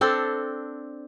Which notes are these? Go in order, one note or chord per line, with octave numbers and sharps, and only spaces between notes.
C4 D4 A4